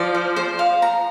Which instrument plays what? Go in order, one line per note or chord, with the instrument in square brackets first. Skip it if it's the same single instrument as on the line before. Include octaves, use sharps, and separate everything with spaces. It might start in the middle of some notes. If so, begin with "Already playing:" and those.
Already playing: [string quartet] F3 [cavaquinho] D5
[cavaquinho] C5
C5
F5
A#5